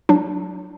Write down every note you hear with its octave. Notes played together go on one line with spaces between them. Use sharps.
F#3 D4